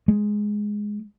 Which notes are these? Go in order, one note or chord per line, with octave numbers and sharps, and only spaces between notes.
G#3